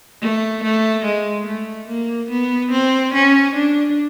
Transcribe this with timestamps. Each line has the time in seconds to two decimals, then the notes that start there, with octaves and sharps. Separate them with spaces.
0.21 A3
0.63 A3
1.05 G#3
1.46 A3
1.88 A#3
2.30 B3
2.71 C4
3.14 C#4
3.55 D4